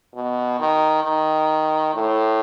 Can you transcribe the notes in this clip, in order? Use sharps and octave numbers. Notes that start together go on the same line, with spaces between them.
B2
D#3
D#3
A2